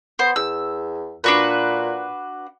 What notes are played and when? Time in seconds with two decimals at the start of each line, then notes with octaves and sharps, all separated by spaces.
0.19 B3 C5
0.36 E2 E6
1.24 A#2 D4 F#4 B4